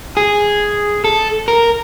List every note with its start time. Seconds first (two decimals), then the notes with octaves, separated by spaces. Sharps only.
0.17 G#4
1.04 A4
1.48 A#4